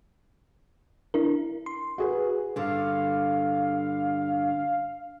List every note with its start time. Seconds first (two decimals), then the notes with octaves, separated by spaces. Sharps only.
1.14 D4 E4 A#4
1.66 C6
1.98 F#4 G#4 B4
2.56 G2 D3 F5